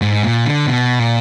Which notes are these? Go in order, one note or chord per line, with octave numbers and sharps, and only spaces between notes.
G#2
A#2
D3
B2
A#2